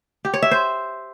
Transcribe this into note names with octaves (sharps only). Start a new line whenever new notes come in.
G4
C#5
E5
C5